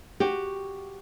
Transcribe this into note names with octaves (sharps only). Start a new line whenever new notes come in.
F#4 G4